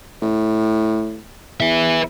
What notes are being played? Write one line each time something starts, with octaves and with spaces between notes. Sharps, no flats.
A2
E2 B4 E5